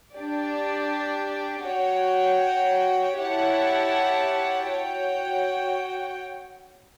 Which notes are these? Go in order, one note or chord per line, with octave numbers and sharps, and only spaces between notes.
D4 G4 D5
F#4 C#5 G5
E4 G4 C#5 F#5 A5
F#4 C#5 G5